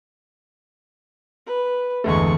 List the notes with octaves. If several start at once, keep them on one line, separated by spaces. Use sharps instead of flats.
B4
G1 E2 G#3 A3 C#6